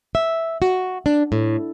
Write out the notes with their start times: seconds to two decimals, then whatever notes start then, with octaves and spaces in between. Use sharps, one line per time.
0.15 E5
0.62 F#4
1.06 D4
1.32 A2